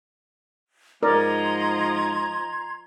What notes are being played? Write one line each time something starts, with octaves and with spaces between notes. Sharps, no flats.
G#2 F3 A#4 D5 D#5 A#5 C6 G#6